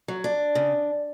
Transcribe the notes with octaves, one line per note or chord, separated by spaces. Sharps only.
F#3
D4
C#3